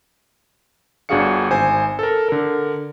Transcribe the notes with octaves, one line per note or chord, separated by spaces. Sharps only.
G1 D4 F#4 G#4 F5 C#7
G#1 C5 G#5
A4 A#4
D3 A#4